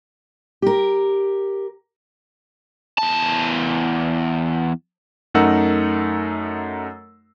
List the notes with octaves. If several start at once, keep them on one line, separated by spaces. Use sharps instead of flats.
G4 A#4
E2 A5
F#2 A3 D#4 A#4 F#5 E6